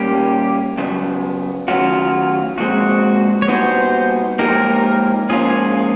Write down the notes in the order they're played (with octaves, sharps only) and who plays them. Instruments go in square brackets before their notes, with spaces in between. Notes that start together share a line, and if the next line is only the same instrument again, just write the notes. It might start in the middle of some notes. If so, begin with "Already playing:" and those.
Already playing: [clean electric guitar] A#2 G3 A#3 C#4 [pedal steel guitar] G4
[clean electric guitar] F#2 C#3 F#3 B3
[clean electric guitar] D#3 F#3 A3 C#4 F#4 [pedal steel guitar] F4
[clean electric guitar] A#2 F3 G#3 C4 [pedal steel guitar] F#4
[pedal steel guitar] C#5
[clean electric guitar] A#2 G3 B3 D#4 F#4 [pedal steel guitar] C5
[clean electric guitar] G#2 F3 A#3 D#4 G4 [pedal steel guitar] A#4
[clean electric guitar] G#2 F3 A#3 C#4 F4 [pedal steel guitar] G#4